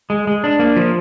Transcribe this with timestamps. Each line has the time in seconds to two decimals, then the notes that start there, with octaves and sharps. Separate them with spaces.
0.10 G#3
0.27 G#3
0.44 D4
0.59 A#3
0.76 F3